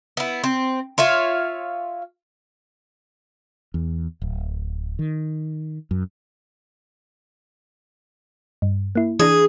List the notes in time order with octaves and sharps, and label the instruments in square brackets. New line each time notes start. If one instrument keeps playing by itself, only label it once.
[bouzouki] B3 E4
C4
F4 C#5 E5 F5
[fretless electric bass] E2
D1
D#3
F#2
[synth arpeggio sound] G2
A#3 E4
[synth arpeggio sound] E3 D4 [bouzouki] G#4